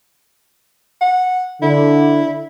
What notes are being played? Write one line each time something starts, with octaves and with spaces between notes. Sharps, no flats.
F#5
D3 E4